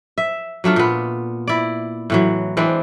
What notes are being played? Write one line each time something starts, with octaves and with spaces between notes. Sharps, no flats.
E5
F#3 A3 D4 F4
A#2 B3
E4 D5
A2 E3 F#3
E3 G#3 C4 D4